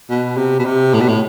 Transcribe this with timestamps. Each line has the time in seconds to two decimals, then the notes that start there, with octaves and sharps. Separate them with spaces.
0.10 B2
0.37 C3
0.59 B2
0.65 C3
0.94 A2
1.01 B2
1.08 A2